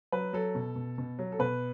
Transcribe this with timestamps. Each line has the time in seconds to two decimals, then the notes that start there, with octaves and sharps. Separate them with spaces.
0.12 F#3 B4
0.33 F#3 A4
0.55 B2
0.76 B2
0.98 B2
1.19 F#3
1.32 A4
1.39 B2 B4